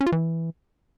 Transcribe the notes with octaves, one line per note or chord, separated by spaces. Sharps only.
C#4
F4
E3